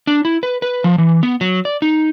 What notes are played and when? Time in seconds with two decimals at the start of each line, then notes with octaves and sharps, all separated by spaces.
0.07 D4
0.25 E4
0.43 B4
0.62 B4
0.84 F3
0.98 E3
1.23 B3
1.41 F#3
1.65 D5
1.82 D#4